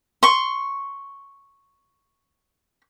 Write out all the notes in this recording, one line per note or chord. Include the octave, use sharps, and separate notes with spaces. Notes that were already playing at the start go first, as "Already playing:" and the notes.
C6 C#6